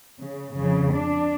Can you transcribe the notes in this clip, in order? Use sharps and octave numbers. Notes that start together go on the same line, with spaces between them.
C#3
F2 C#3
D4